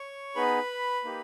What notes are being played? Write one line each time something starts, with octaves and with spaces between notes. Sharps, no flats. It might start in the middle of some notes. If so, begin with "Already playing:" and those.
Already playing: C#5 C#6
B3 D#4 G#4 B4 B5
A#3 D#4 G4